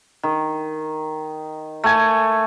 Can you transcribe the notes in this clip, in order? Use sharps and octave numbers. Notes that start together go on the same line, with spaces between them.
D#3
A3 G#5